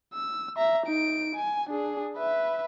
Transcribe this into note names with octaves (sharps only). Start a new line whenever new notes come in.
E6
E5 A#5
D#4 D7
G#5
D4 G#4
B4 E5